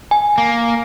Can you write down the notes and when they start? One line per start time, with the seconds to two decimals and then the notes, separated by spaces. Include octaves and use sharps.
0.11 G#5
0.38 A#3